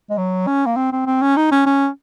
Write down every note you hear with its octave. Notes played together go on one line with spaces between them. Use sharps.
G#3
F#3
C#4
A#3
C4
C4
C4
C#4
D#4
C#4
C#4